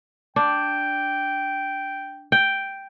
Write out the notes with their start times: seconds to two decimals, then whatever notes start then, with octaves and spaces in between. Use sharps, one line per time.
0.36 D4 G5
2.32 G5